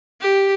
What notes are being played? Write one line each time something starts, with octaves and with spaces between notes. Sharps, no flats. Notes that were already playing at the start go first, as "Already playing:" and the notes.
G4